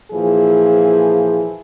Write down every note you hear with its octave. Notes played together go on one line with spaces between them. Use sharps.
A#2 E3 F3 G#4